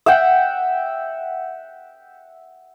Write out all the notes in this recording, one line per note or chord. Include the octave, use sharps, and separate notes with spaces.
E5 F#5 G5